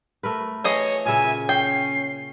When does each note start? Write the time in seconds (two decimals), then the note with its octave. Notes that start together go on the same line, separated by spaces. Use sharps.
0.23 A3 A#4 B4
0.64 E3 G#4 C#5 D#5
1.06 A#2 C#3 E5 G#5
1.49 C#4 G5 C7